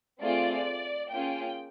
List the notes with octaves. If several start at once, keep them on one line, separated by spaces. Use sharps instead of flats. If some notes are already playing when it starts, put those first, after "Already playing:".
A3 C4 F4 G#4 D5
A#3 C#4 F4 G#4 G5